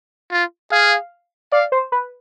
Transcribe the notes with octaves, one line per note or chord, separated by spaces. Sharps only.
F4
G#4 F5
D5 F5
C5
B4